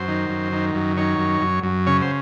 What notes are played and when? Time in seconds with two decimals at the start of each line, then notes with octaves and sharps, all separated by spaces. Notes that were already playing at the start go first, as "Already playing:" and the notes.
Already playing: F#2 C5
0.08 D#3
0.30 F#2
0.52 D#3
0.75 F#2
0.97 D#3 C#5
1.19 F#2
1.41 F#2
1.63 F#2
1.87 C#3 C#5
2.02 C5